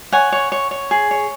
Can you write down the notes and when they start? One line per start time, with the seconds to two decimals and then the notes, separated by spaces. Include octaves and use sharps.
0.12 C#5 F#5 G#5
0.32 C#5
0.52 C#5
0.71 C#5
0.91 G#4
1.11 C#5